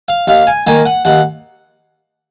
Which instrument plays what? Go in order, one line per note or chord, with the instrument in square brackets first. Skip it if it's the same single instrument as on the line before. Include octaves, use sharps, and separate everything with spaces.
[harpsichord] F5
D#2 F5
G#5
D#3 A#3 G#5
F#5
D#2 F#5